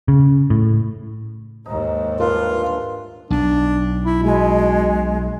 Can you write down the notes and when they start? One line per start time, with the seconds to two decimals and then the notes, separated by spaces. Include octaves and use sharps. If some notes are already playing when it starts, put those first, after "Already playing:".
0.08 C#3
0.50 A2
1.66 D#2 G#2 D#4
2.20 G2 E3 D4 F4 A#4
3.30 B1 D4
4.05 E4
4.23 B2 G#3